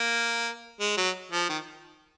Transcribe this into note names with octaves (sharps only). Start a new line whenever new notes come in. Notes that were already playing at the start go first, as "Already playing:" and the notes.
Already playing: A#3
G#3
F#3
F3
D#3